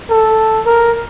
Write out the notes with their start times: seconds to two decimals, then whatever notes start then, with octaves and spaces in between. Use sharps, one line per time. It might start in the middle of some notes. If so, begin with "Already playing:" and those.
0.10 A4
0.66 A#4